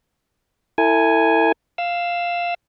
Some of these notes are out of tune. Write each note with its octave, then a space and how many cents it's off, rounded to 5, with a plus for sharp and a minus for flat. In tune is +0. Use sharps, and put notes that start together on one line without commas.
E4 +0 A4 +40 G#5 +0
F5 +0 E6 +15